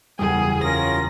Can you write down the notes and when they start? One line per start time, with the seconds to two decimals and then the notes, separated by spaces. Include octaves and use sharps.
0.19 F#1 E2 G3 G#4 D#6
0.63 C#4 F4 A#4 A#6